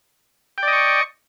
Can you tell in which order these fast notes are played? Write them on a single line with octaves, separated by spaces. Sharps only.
G5 D5 D#5 C#6